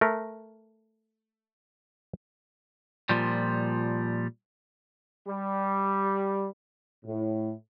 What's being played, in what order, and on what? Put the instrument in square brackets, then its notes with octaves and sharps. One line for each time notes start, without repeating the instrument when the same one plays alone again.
[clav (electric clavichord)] A3 A#4
[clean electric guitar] A#2 F3 G3
[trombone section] G3
[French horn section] A2